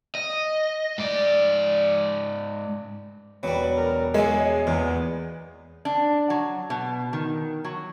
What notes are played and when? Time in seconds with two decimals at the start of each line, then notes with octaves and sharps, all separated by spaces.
0.15 D#5
0.98 G#2 D5
3.43 E1 F#3 G3 B4
3.77 A#4
4.14 F#3 G#3 E5 G#5
4.67 E2 A#2 B3
5.85 D4
6.30 F#3
6.70 B2
7.13 D#3
7.64 F#3